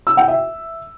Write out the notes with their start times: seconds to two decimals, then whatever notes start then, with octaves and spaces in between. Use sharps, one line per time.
0.07 E6
0.17 G5
0.28 E5